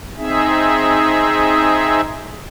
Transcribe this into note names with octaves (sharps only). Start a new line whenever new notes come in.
C4 D#4 G#4 E5